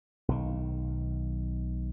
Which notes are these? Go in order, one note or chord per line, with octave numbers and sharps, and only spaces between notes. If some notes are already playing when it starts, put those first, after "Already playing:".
B1 D#3